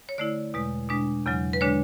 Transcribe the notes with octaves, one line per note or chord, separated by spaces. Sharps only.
C#5
D3 A3 E4 D5
E2 B2 G#3
B2 G#3 D4
E2 C#3 F#3
B4
D3 G#3 D4 C#5